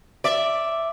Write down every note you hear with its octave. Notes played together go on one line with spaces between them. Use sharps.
D5 E5